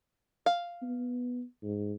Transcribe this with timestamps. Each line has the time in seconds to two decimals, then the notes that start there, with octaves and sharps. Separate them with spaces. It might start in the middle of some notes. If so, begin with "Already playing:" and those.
0.46 F5
0.82 B3
1.63 G#2